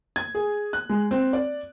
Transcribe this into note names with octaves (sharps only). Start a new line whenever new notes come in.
G#6
G#4
F#6
G#3
C4
D5